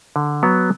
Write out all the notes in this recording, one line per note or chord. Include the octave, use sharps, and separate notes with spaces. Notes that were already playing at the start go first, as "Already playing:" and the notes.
D3
F#3 B3